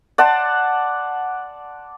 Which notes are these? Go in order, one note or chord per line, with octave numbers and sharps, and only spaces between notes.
D5 F#5 A5 C6